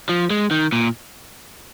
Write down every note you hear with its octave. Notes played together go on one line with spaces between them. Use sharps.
F3
G#3
D#3
A#2